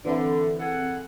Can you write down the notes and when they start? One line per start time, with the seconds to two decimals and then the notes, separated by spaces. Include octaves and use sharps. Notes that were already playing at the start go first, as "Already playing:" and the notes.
0.05 D3 E3 C4 E4
0.59 G#4 A4 F#5